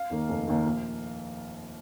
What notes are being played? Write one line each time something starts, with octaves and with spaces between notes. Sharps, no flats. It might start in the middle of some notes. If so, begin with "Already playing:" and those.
Already playing: F5
D#2 D#3 A#3
F1
D#2 D#3 A#3
A#1